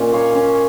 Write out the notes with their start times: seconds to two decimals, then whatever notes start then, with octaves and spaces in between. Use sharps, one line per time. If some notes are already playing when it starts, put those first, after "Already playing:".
Already playing: A#2 C#4 D#5
0.13 A#3 C#5 F5
0.35 C#4